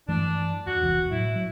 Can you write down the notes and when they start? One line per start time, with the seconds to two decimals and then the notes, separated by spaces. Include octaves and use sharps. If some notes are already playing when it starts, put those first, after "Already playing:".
0.08 G2 E3 A3 D4
0.67 E2 F#4
0.83 E1 C2 E3
1.11 A2 F#3 E4
1.35 F#3